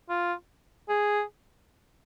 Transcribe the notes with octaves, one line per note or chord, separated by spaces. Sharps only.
F4
G#4